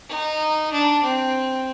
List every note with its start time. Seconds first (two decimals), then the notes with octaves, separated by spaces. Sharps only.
0.09 D#4
0.72 D4
1.03 C4